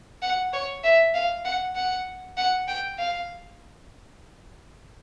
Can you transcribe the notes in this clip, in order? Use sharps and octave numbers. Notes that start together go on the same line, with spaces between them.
F#5
C#5
E5
F5
F#5
F#5
F#5
G5
F5